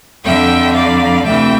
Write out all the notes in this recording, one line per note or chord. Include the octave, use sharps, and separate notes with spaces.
F2 D3 E5 G5
D5 F5
D2 C3 E3 E5 G5